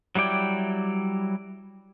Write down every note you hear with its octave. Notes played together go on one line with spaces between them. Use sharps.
F#3 G3 E4 D5 G5